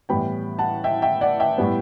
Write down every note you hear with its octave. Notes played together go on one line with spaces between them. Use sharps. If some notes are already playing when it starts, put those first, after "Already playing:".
A2 E3 G3 B3 G5 B5
F#5 A5
E5 G5
E5 G5
D5 F#5
E5 G5
A2 G3 B3